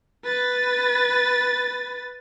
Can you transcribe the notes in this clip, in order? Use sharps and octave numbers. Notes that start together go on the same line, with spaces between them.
B4 A6